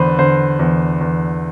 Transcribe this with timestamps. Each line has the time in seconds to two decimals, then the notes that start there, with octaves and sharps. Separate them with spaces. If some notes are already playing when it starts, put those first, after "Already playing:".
Already playing: E2 D3 B4 C5
0.19 D3 C5
0.59 E2
1.01 E2